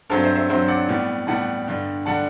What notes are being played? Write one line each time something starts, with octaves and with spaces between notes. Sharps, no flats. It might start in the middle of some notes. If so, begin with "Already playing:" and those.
G2 F#3 C4 A4 C5
C5 E5
C5 E5
G2 F#3 C4 C5 E5
D5 F#5
A2 G3 B3
A2 G3 B3 F#5 A5
G2 D3 G3
D3 G3 F#5 A5